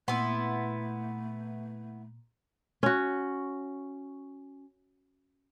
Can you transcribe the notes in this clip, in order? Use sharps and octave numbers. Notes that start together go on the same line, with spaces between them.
A#2 A3 B3 E4 C6
C#4 F#4